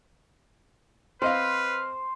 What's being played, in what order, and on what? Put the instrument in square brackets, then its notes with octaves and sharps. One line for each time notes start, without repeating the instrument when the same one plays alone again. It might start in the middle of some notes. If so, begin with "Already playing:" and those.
[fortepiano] C4 D#5 F5 [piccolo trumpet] B4 [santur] C5 [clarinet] F6